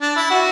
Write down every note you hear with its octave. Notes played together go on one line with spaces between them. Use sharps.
D4
E4
F#4